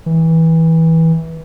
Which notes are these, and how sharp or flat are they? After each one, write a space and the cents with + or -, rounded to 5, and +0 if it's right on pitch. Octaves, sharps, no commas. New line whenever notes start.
E3 -20